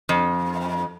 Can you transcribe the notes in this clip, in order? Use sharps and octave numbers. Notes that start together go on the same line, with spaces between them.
F2